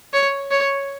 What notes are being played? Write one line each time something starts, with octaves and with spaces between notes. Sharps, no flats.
C#5
C#5